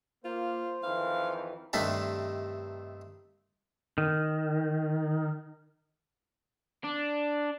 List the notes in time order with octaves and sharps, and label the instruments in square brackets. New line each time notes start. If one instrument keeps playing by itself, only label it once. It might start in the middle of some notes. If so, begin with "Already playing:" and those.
[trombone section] A#3 [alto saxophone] F4 [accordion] C5
[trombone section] F2 D#3 E3 [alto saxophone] F5
[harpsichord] G2 C3 D#3 A3 D4 E5
[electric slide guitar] D#3
[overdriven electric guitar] D4